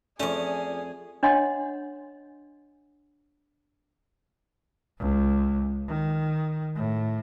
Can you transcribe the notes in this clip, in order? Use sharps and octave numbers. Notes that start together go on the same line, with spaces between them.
F2 A3 C#4 G#4 D5
D4 C#5 D#5 F#5 C6
C#2
D#3
A2